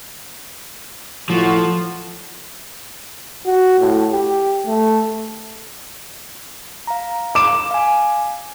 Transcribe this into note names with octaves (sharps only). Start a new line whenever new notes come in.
A2 F3 F4 F#4
F#4
A2
G4
A3
F5 A#5
D6 E7
F5 G#5